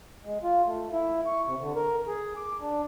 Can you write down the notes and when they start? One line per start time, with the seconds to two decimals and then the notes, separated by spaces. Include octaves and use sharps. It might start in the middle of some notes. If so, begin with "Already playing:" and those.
0.25 G#3
0.44 F4
0.66 A3
0.93 E4
1.26 C#6
1.46 C3
1.60 D3
1.75 A#4
2.08 G#4
2.37 D6
2.61 D4